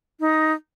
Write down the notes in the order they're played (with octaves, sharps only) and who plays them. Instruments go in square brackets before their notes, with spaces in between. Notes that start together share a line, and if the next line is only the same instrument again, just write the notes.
[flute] D#4